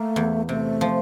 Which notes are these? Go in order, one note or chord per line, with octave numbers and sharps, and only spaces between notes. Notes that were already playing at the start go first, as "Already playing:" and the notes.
Already playing: A3 A#3
E2
C3 A3
F3